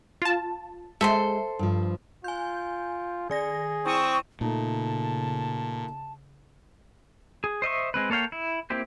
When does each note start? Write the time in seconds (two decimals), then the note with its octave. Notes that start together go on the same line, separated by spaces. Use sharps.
0.22 F4 A5
1.01 G#3 A4 C5 E5 C6
1.59 G2 F3
2.24 F4 G#5 G6
3.30 D#3 G#4 D5 A#6
3.86 C4 E4 C#6 D#6 D#7 E7
4.41 A#2 C#3 A3 D#4 A5
7.44 G#4
7.62 C5 D#5 E5 C#6
7.94 G#3 C4 B4
8.10 A#3 A4 C#5 F5 G5
8.32 E4
8.70 A#3 C4 E4 G4 C5